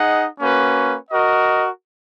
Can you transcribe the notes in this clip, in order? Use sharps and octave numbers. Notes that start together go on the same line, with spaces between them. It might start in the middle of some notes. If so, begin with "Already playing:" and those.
Already playing: D#4 G#4 D#5 F#5
A#3 C#4 F#4 B4
F#4 A#4 D#5